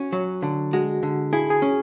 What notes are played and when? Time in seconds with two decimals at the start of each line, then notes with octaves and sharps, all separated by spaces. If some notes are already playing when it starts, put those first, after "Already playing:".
Already playing: C#4 F#4
0.13 F#3
0.42 D3
0.73 G#3 F#4
1.03 D3
1.33 E4 G#4
1.50 G#4
1.62 C#4